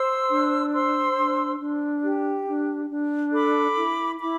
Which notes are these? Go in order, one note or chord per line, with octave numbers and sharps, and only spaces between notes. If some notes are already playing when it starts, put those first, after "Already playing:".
Already playing: C5 C6 E6
D4
C5 C6 E6
D4
D4
G4
D4
D4
A4 B5 D6
E4
E4 B5 D6